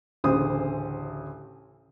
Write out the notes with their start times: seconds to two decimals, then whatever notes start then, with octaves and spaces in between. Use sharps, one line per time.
0.24 A1 D2 C#3 C5 D#6